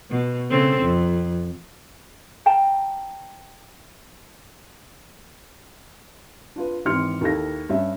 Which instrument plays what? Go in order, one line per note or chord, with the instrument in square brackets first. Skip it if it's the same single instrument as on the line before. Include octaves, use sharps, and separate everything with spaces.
[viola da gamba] B2
C#3 C4 A4
F2
[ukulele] F5 G5 A5 A#5
[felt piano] D4 F4 B4
G#1 E3 G4 C6 F6 C#7
D#2 E4 A4 F5 A#6
G2 C#4 E5